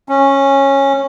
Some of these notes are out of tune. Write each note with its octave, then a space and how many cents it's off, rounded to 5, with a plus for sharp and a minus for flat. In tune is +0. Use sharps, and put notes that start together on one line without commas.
C#4 -15